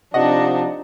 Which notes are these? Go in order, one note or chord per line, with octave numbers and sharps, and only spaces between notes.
C3 F3 D4 D#4 D#5 F#5